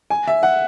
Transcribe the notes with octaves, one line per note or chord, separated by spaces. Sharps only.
G#5
E5
F#5